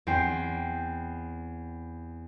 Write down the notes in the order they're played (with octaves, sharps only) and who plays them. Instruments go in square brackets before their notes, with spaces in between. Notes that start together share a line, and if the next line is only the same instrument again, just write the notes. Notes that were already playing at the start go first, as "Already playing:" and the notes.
[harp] E2 C4 G5 C7